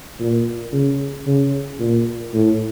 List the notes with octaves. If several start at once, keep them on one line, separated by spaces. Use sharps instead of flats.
A#2
C#3
C#3
A#2
A2